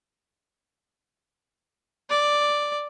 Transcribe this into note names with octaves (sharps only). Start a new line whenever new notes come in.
D5